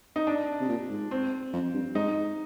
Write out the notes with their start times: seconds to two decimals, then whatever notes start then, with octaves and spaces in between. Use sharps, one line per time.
0.16 D#4
0.27 D4
0.60 C3
0.69 A#2
0.89 G#2
1.11 C4
1.53 F2
1.74 G2
1.95 G#2 D#4